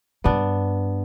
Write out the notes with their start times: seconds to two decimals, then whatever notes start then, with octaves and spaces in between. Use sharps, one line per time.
0.24 G2 B3 D4